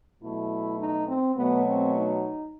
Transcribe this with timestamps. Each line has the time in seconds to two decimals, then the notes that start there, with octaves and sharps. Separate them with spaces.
0.23 B2 F#3 A3 E4
0.79 D#4
1.08 C4
1.36 B2 F#3 A3 B3
1.65 C4
1.94 D#4